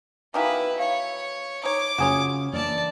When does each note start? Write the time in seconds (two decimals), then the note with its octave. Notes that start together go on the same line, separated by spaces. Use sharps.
0.34 B2 D#3 E3 E4 B4 F5 D6
0.79 C#5 F5
1.63 D#4 C#5 D6
1.98 C#3 C#4 F4 F#4 G#4 C#5
2.53 E3 A#3 D4 A#4 B4 D5 A5